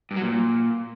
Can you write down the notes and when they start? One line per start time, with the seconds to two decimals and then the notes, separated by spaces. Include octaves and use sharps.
0.11 G2
0.16 F#3
0.22 A#2